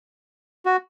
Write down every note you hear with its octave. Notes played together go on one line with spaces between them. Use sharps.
F#4